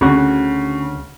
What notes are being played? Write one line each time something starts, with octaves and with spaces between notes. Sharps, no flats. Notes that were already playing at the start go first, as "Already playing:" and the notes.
D2 C#3 F#4